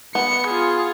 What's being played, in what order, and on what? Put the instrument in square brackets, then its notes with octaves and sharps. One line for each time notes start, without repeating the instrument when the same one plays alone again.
[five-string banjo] B3 [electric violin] C#7
[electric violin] F4 G#4